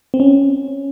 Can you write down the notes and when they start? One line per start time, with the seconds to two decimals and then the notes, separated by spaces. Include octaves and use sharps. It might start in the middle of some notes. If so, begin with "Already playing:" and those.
0.14 C4
0.20 C#4